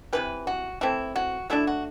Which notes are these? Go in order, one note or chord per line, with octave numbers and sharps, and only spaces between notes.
C3 E3 G3 B4
F#4
E3 A3 C4 E4
F#4
F#3 A3 D4 E4
F#4